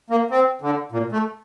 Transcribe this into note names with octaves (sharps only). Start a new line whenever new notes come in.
A#3
C4
D3
A#2
A3